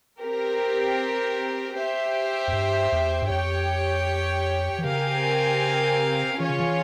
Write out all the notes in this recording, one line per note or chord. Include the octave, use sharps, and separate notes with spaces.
C4 G4 A#4
G4 C5 E5
F2
G2
E2
G2
F2 G4 C#5 G5
E3
C#3 C4 G4 A#4 F5 G#5
E3 C#4 F4 G#4 C#5
C#3
E3